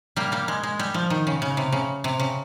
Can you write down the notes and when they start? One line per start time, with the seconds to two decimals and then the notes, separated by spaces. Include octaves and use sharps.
0.16 G3 A#3
0.32 G3 A#3
0.48 G#3
0.63 G#3
0.79 G3
0.94 F3
1.10 D#3
1.27 C#3
1.42 C#3
1.57 C3
1.72 C#3
2.04 C3
2.20 C#3